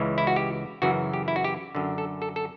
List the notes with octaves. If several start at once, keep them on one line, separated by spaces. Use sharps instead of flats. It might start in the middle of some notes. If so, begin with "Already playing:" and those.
Already playing: C#2 C#3 E3
E4
F#4
G4
F#2 C#3 E3 F#4
G4
E4
F#4
G4
F#2 D3
A4
A4
A4